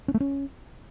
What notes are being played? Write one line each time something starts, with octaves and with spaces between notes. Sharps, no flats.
C#4
A3
C#4